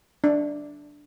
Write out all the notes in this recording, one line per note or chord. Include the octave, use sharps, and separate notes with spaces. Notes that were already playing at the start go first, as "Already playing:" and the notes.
D4